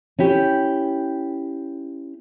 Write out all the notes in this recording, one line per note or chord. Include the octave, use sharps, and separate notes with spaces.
C#4 E4 G4